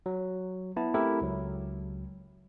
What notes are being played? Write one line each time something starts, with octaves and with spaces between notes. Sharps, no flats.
F#3
B3 E4 A5
A3 C4 E4 G4 A4 A#4
C#2 F#3